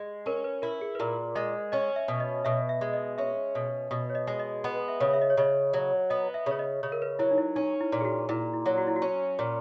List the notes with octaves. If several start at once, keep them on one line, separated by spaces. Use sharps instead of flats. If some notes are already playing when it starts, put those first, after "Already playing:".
Already playing: G#3
C#4 A#4
B4
E4 A#4
G#4
B4
A#2 A#4
G#3 D#5
C#4 D#5
E5
B2
D#5
B2 E5
E5
G#3
D#5
C#4 E5
B2
B2
C#5
D#5
G#3
D#5
B3 D#5
E5
C#3
E5
D#5
C#5
C#3 D#5
F#3
B3 D#5
E5
C#3 C#5
D#5
C#3 C#5
A#4
B4
F#3 E4
D#4
E4
C#4 D#4
E4
A#2
G#4
F#4
A#2 E4
E4
F#3
F#4
E4
F#4
C#4
A#2